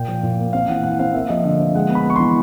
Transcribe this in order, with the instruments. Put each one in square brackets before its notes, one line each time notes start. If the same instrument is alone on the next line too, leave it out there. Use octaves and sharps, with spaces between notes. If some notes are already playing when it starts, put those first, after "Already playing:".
Already playing: [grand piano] A#2 G5
F3
A#2
A#3
C4 F5
E3 F#5
E3 F#5
C4 F5
A#3 E5
F3 D#5
D3 E5
F3
G#3 F#5
B3
B5
B3 C#6
E3 C6